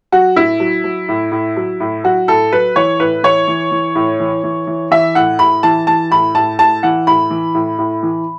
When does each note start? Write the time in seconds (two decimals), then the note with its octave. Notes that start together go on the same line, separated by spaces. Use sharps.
0.12 F#3 F#4
0.36 A2 E4
0.60 F#3
0.84 F#3
1.09 A2
1.32 A2
1.57 F#3
1.80 A2
2.04 F#3 F#4
2.28 A2 A4
2.52 F#3 B4
2.76 E3 C#5
3.00 A2 B4
3.23 E3 C#5
3.48 E3
3.71 E3
3.95 A2
4.20 E3
4.44 E3
4.67 E3
4.91 E3 E5
5.15 A2 F#5
5.39 A2 B5
5.63 E3 A5
5.87 E3 A5
6.11 A2 B5
6.35 A2 A5
6.59 A2 A5
6.83 E3 F#5
7.07 A2 B5
7.30 E3
7.55 A2
7.78 A2
8.03 E3